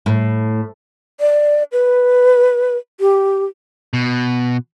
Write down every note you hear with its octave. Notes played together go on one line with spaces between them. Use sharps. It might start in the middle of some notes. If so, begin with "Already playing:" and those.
A2
D5
B4
G4
B2